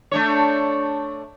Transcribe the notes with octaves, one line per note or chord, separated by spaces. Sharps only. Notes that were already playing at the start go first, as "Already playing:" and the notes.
A3 D4 C#5